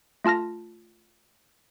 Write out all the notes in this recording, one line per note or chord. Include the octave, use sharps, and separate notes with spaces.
A3 F4 A5 F6 A#6